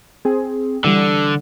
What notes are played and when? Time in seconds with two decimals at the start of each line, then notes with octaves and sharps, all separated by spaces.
0.25 C4 G#4
0.84 D3 E3 G3